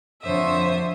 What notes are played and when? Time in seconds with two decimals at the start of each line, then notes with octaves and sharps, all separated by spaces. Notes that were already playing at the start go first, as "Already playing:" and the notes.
0.23 F2 D3 C5 C#5 E5 D#6